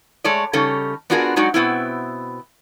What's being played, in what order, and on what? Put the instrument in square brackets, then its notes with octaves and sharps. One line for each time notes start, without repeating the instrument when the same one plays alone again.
[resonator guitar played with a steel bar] G#3 A3 A4 C#5 D5
C#3 G3 C#4 D#4 A4
B3 D4 F4 F#4 G#4 A#4
F#3 G#3 D#4 F#4 D5
B2 B3 C4 E4